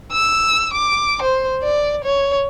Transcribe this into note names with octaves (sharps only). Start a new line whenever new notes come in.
E6
D6
C5
D5
C#5